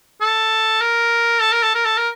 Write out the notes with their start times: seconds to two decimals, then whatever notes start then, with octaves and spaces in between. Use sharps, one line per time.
0.21 A4
0.81 A#4
1.40 A4
1.52 A#4
1.63 A4
1.75 A#4
1.85 A4
1.98 A#4